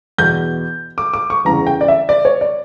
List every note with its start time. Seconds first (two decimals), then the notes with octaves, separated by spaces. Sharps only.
0.18 E2 B2 G6
0.98 D6
1.13 D6
1.30 C#6
1.45 E2 C#3 E3 A#5
1.67 G5
1.81 D5
1.88 E5
2.09 D5
2.25 C#5
2.41 D5